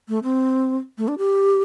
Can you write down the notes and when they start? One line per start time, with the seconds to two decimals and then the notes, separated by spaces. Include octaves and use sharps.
0.09 A3
0.23 C4
0.98 A3
1.08 D4
1.18 G4